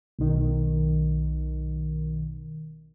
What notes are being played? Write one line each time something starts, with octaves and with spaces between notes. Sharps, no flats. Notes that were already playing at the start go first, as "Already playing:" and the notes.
B1 D#3